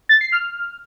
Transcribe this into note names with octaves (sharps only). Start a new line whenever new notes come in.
A6
C7
F6